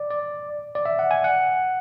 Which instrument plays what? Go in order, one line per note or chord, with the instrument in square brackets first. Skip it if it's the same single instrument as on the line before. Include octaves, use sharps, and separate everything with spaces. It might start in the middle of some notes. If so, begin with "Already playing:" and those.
Already playing: [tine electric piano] D5
D5
D5
E5
F#5
G#5
F#5